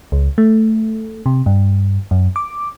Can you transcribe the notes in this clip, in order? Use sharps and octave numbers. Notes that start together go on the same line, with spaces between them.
C#2
A3
C3
G2
F#2
D6